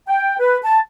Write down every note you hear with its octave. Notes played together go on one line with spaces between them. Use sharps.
G5
B4
A5